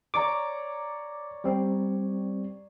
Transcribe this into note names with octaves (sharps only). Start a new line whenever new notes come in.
C#5 D5 A#5 D6
G3 C4